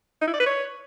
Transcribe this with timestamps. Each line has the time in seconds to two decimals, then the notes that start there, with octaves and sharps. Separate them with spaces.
0.21 D#4
0.27 E4
0.34 D5
0.40 B4
0.46 C#5